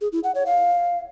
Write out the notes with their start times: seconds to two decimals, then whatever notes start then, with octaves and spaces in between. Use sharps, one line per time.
0.01 G#4
0.12 E4
0.23 F#5
0.35 C#5
0.46 F5